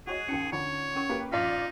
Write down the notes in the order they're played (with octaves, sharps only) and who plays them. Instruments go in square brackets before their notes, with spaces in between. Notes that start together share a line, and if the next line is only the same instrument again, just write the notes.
[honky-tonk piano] F#4 C#5 D#5 [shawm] G#4
[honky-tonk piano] D#2 G5 C#7 [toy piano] C#4 D#4
[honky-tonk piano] D3 [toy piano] F4 [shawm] C#5
[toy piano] C#4 A#4 C#6
[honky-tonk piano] A#3 G4 B4
[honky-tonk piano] A#1 D5 B6 [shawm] D#4 [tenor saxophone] F4